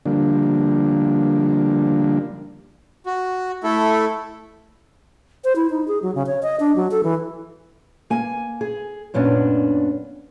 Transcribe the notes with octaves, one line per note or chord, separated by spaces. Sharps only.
D3 F3 G3 A#3 D4
F#4
A3 E4 A4
C5
E4
D#4
G#4
F#3
C#3
C#5
D#5
D4
F#3
A4
E3
A#3 G#5
G#4
F#2 A#2 B3 C#4 D4